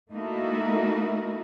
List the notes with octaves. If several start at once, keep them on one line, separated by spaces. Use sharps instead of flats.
A3 A#3 D#4 E4 F#4 A#4